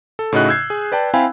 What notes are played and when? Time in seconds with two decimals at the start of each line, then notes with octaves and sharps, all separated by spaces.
0.19 A4
0.32 A2 C#3 D#4 F#4 D#5 F#6
0.48 E6 G6 G#6 C7
0.70 G#4
0.92 B4 D5 G5 A5
1.14 C4 E4 F5 G5 G#5 B5